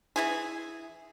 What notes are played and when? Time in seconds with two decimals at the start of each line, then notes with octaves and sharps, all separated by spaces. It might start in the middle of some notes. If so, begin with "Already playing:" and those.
0.16 E3 E4 G#4